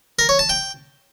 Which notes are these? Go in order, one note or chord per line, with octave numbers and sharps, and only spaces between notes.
A#4
C#5
A5
G5